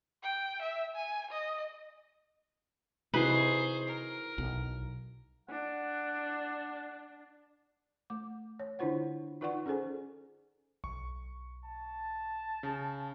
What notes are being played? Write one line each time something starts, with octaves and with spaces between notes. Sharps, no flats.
G5
E5
G#5
D#5
C3 D#4 E4 F#4 G#4 B4 C5
A#4
B1
D4 F#5
A3 D6
C#5
D3 D4 E4 F4 C5 F#5
D#4 F4 B4 D5 F#5 C#6
C#4 G#4 A4 C5 G#5
B1 C#6
A5
C#3